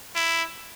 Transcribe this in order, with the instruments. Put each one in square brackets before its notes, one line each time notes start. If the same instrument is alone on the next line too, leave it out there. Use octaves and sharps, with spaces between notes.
[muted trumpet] E4